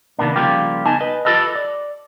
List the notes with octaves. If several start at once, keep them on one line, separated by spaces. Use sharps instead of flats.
C3 D#3 A#3 B3 D4
C#3 F3 G3 A#3 F4 G4
B3 D#4 D#5 G#5 A5
B4 D#5
F4 G4 A4 B4 D#5
D5